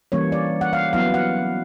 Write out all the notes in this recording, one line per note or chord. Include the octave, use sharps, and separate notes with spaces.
E3 G3 A#3 C#4 C#5
D5
F#5
F5
F#3 B3 E4 F5
F#5